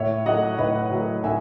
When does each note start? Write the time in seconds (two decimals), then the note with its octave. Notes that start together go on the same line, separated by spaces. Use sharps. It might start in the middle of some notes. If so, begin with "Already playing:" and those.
Already playing: A2 C#5 E5
0.25 F#3 A3 D#5 F#5
0.58 A2 B4 D#5
0.91 F#3 A3
1.24 A2 E5 G#5